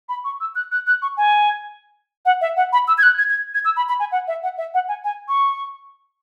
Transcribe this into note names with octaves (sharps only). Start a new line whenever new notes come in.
B5
C#6
E6
F#6
F#6
F#6
C#6
G#5
F#5
E5
F#5
B5
E6
G#6
F#6
G#6
G#6
G#6
E6
B5
B5
G#5
F#5
E5
F#5
E5
F#5
G#5
G#5
C#6